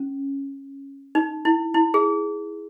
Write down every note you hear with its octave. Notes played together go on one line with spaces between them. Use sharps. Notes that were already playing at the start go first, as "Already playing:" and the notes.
Already playing: C#4
D#4
E4
E4
G#4